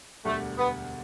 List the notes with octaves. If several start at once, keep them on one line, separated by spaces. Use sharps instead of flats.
E1 D2 D3 G3 A3
B3